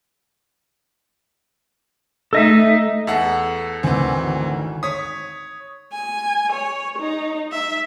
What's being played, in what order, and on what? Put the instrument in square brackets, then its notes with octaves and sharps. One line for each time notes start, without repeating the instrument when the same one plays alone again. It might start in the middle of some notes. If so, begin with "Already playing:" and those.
[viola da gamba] A3 D#4 [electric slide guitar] A4 D#5 E5
[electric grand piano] E2 A4 F#5
[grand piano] G#1 D2 G#5 [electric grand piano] E3 C4
[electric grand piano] C#5 D#6 [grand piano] B6
[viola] G#5
C#5
D#4
E5